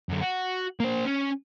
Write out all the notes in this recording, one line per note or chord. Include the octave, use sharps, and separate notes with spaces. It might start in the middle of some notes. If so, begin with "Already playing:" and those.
F#2 D3
F#4
A#3 C5
C#4